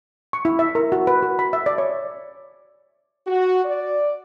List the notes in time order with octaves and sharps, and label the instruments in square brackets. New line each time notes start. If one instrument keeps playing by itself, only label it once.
[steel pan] C#6
E4
E5
A#4
F#4
B4
F#4
B5
E5
D5
C#5
[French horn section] F#4
D5